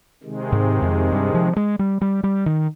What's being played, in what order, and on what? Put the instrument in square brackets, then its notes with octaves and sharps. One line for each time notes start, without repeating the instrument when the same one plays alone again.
[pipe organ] C3 D#3 G#3
[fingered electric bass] G#2
F2
G2
F3
G#3
G3
G3
G3
D#3